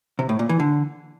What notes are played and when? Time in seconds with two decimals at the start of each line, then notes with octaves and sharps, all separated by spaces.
0.19 C3
0.29 A2
0.39 A#2
0.49 E3
0.60 D3